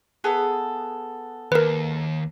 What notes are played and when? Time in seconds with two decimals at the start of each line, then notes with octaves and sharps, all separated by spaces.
0.24 B3 G#4 A4
1.52 D#2 A#4 B4